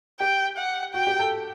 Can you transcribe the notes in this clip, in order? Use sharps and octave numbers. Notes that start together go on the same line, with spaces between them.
G4 G5
F#5
F#4 G5
G4
A4